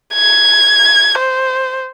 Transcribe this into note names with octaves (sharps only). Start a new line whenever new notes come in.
G#6
C5